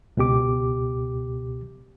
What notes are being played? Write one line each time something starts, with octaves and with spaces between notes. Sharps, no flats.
C#2 B2 G4 D6